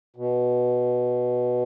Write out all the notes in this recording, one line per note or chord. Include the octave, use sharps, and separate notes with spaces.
B2